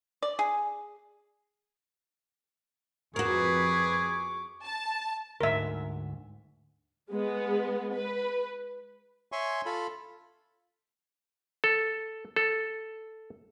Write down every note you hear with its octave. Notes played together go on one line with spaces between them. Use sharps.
D5
G#4
F2 F#4 G#4 A#4 B4 C#6 D6
A5
D2 G#2 A#4 E5
G#3 B3
B4
C#5 E5 G#5 C6 C#6
F4 A4 B5
A4
A4